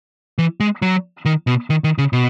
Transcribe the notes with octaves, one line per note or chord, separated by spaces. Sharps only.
E3
G#3
F#3
D#3
B2
D#3
D#3
C#3
B2